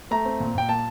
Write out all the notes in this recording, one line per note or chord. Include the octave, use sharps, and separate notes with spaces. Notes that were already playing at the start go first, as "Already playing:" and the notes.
A3 A#5
C4
A#2
A#2 G5
A#3 A5